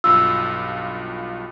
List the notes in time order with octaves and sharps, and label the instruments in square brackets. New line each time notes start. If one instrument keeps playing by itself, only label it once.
[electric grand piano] B1 G2 F4 [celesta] E6